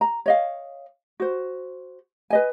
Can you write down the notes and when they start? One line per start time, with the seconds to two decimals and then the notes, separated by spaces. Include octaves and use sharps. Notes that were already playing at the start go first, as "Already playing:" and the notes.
0.01 A#5
0.26 C#5 D#5 F5
1.20 F#4 C5
2.30 B4 D#5 G#5